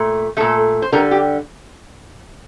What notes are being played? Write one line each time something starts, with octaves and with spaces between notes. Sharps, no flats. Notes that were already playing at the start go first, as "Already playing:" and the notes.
Already playing: A#2 A3
A#2 A3 A4
C5
D3 G3 A#4
G4